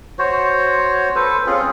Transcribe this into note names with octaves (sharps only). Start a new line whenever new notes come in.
F#4 C5 C#5
A4 B4 C5
C4 C#4 F4 G#4